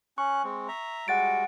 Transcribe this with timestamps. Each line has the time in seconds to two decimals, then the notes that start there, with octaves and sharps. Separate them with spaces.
0.18 C#4 C#6 F#6
0.44 G#3 C4
0.68 E5 A#5
1.08 G3 G#3 F#4 F#5 A6 D7